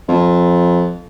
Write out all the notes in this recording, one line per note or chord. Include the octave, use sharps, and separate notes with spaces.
F2